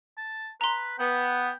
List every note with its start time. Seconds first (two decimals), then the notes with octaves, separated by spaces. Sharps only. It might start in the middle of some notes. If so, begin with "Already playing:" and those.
0.17 A5
0.61 B4 A#5 C6
0.98 B3 G5